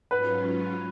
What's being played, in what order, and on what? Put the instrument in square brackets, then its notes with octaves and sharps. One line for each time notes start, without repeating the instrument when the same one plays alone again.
[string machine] G#2 F#3 C#4 F4 [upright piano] B4